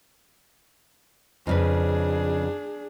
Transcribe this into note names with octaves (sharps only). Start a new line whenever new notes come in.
F2 C#3 D4 G#4 B4